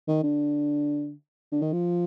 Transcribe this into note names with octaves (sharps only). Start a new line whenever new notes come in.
D#3
D3
D3
D#3
F3